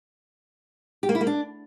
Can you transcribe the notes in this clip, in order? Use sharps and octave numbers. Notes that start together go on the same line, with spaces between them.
G4
A#3
E4
A#3
D4